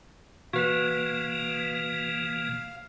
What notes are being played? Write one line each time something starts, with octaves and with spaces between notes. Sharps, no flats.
B2 E3 A#3 F#4 B4 F5